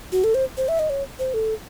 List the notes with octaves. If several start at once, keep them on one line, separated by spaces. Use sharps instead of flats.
F#4
A4
C5
C5
E5
D#5
C#5
C5
A4